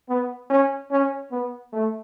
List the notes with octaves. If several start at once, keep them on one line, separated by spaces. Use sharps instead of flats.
B3
C#4
C#4
B3
A3